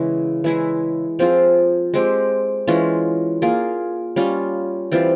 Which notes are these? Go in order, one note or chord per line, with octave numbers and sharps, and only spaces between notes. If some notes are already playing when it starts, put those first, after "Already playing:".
Already playing: C#3 E3 G#3 E4
E3 G#3 E4 G#4
F3 C4 F4 G#4
G#3 C4 G4
E3 G#3 C#4 F4
A#3 F4 G#4
G3 C#4 F4
E3 G3 C4 F4